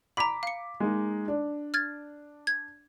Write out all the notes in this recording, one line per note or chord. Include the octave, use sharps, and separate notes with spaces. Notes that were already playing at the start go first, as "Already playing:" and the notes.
A#5 B5 D6 B6
F5 C#7
G#3 A#3 D#4
D4
F6 G#6 A6
G#6